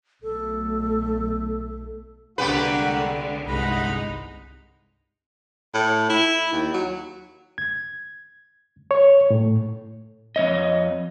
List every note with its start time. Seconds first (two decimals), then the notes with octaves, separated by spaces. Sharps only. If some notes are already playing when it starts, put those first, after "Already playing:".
0.23 B1 A3 A4
2.38 C2 D3 G#3 A#3 B3 F#4 G4 B4
3.46 G1 C2 G#3 D#4 F#5 B5
5.74 A2
6.09 E4
6.52 D#2
6.74 F#3
7.58 G#6
8.91 C#5
9.30 A2
10.36 F2 G#3 C#5 D#5